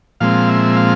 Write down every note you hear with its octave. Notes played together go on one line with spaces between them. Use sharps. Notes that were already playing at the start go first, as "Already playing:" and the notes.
A#2 F3 G#3 C4 F5
E5
F5